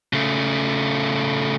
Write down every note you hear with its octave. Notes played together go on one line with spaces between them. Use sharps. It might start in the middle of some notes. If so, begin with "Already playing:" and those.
C#3 A3